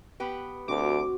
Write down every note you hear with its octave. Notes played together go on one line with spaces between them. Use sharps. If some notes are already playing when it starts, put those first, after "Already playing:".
B3 G4 B4
D2 C4 F#4 D6